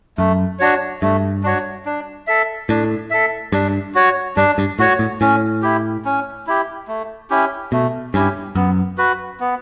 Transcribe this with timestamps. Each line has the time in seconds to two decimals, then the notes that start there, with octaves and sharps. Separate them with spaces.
0.18 F#2 A3
0.59 D4 F#4 C#5
1.02 G2 A3
1.43 D4 F#4 C#5
1.86 D4
2.27 A4 E5
2.69 A2 D4
3.11 A4 E5
3.52 G2 D4
3.95 F#4 C#5
4.37 G2 D4
4.58 G2
4.79 A2 F#4 C#5
4.99 A2
5.21 A2 C#4
5.62 E4 G4
6.05 C#4
6.47 E4 G4
6.88 A3
7.30 C#4 E4 G4
7.72 B2 A3
8.14 G2 C#4 E4 G4
8.55 F#2 B3
8.98 F#4 B4
9.40 B3